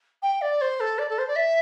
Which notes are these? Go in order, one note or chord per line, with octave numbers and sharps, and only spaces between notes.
G5
D5
C5
A4
D5
A4
C5
D5
E5